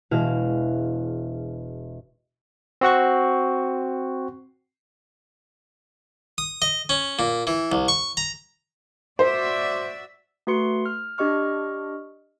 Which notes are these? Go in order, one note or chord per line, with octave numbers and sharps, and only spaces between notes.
E1 B2 E4 F#4 G#4 F5
C4 F#4 F#5 C#6
D#6
D#5
C#4
A#2
E3
C2
C#6
A#5
F#4 C5 D5 E5
A3 F#4 B4 C6 C#7
F6
D4 G4 D#5 C#6 F6